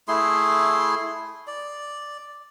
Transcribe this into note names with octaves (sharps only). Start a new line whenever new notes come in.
A3 E4 G#4 C6
D5